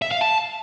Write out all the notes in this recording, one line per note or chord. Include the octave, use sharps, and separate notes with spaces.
E5
F5
A5